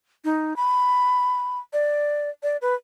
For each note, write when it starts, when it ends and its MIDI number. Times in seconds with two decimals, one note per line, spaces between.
0.25 0.56 63
0.56 1.59 83
1.73 2.30 74
2.43 2.57 74
2.62 2.74 71